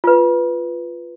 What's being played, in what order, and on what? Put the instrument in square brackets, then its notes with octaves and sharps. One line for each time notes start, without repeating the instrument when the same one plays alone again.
[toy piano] F4 B4